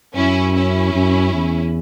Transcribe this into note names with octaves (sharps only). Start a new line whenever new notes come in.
F#2 C#4 E4
C#4 E4
F#2
E2